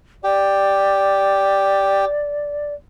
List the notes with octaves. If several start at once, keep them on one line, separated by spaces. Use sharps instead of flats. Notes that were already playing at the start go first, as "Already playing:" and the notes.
G4 D5